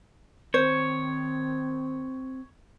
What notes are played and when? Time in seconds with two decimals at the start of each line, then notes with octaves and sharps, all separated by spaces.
0.54 D#3 C4 C5 C#5